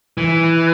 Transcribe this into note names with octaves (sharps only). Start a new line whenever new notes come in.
E3